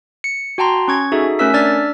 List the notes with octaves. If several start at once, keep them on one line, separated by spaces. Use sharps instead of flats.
C#7
F#4 G5 A5 A#5 C6
C#4 C#6 G#6
D#4 F#4 G#4 A4 E5
A3 C#4 A#4 E5 E6 B6
D4 D5 E6 F6 A6 B6